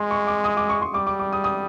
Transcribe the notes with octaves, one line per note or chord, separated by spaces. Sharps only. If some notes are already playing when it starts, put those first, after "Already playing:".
Already playing: G#3 C6
C#6
D6
D#6
D6
C#6
C6
G3 D6
D6
D6
D#6
D#6